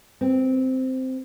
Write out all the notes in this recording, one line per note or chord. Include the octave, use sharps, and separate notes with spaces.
C4